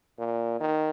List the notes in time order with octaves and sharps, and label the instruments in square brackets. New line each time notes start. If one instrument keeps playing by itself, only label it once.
[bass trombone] A#2
D#3